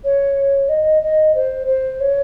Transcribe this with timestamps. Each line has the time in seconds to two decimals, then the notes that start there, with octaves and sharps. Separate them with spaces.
0.04 C#5
0.69 D#5
1.02 D#5
1.35 C5
1.67 C5
2.00 C#5